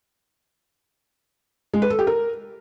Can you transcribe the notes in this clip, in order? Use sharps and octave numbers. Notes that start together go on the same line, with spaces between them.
G#3
B4
A4
G4
A#4